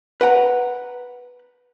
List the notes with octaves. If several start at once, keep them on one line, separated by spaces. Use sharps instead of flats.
B4 F#5 G5 A#5